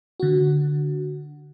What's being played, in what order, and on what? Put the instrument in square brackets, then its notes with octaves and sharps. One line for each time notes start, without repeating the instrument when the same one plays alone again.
[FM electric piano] D3 F#4